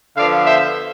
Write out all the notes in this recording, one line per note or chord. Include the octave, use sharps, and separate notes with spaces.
D3 F3 B3 D5 F5
C5 E5